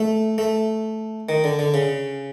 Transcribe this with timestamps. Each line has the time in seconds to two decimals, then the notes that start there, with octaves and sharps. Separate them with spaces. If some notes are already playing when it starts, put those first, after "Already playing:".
Already playing: A3
0.38 A3
1.29 D#3
1.44 D3
1.59 D3
1.74 C#3